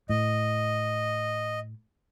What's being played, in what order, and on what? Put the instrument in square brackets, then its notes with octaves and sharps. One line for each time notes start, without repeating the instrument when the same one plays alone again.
[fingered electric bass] A2 [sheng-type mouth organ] D#5